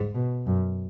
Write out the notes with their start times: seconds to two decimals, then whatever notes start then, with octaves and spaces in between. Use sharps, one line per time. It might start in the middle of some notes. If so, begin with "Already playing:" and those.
Already playing: G#2
0.15 B2
0.46 F#2